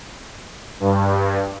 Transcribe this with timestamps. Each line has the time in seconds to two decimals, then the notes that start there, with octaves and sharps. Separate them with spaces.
0.80 G2